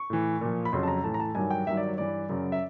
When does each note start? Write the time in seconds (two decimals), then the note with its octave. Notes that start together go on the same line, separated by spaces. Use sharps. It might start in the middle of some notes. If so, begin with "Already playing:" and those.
Already playing: C#6
0.10 A2 E3
0.41 A#2 F3
0.65 B5
0.72 F2 C#3 F#3 C6
0.83 A5
0.88 A#5
1.04 A2 E3 A5
1.14 A#5
1.20 A5
1.35 G2 D#3 F#3 G#5
1.51 G5
1.67 G2 D#3 F#3 E5
1.77 D5
1.88 C#5
1.98 G2 E3 D5
2.29 F#2 C#3 F#3
2.52 E5